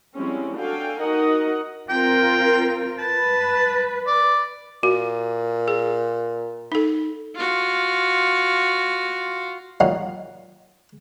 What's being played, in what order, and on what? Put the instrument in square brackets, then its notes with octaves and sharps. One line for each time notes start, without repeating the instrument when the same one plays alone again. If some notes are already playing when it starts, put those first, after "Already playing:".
[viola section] F3 G3 G#3 C4 C#4 E4
D4 F#4 A4 F5 G5 G#5
D#4 F#4 A#4 D#5 F#5
[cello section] C4 F4 A#4 [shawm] G5
[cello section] B4 [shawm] A5
[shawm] D5
[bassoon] A#2 [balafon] F#4
[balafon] G#4
D#4 A4
[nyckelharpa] F4 F#4
[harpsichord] F#3 G3 A#3 D#4 F4 F#4